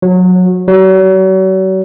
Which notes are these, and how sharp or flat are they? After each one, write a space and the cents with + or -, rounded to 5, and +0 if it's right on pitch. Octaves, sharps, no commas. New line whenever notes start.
F#3 -20
F#3 +40